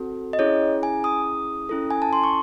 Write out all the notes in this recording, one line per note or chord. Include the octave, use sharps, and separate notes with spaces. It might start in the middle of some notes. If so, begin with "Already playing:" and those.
Already playing: C4 F#4 A4
D#5
C#4 E4 G#4 C#5
G#5
D#6
C#4 E4 A4
G#5
A5
C6
C#6